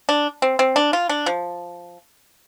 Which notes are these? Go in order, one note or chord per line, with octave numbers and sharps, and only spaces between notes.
D4
C4
C4
D4
F4
D4
F3